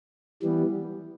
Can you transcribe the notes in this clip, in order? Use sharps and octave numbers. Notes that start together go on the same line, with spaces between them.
E3 G3 B3